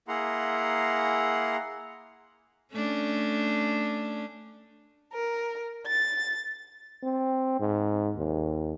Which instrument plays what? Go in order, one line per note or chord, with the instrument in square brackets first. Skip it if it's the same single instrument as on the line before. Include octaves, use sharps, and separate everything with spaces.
[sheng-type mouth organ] A#3 E4 G#4 F#5 A#5 C6
[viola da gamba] A3 C#4 D4
[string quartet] A#4
A6
[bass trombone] C4
G#2
D#2